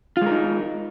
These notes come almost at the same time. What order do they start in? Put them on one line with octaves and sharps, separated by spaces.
F4 G#3 A#4 D#4